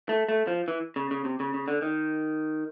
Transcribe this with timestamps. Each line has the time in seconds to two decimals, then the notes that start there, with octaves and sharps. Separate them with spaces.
0.09 A3
0.29 A3
0.47 F3
0.68 E3
0.96 C#3
1.11 C#3
1.25 C3
1.40 C#3
1.54 C#3
1.68 D3
1.82 D#3